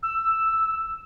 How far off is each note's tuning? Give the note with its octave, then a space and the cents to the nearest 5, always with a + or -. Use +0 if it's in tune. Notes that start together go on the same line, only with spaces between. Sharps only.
E6 +5